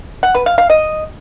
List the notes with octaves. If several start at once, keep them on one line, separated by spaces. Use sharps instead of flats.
F#5
B4
F5
F5
D#5